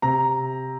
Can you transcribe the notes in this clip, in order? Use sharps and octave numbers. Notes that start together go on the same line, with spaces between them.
C3 A#5